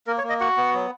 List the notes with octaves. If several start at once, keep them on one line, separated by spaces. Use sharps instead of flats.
A#3 A#4
C#5
A#3
D#5
F#4 F#5
B3
F#3